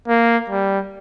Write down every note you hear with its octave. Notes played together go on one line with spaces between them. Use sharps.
A#3
G3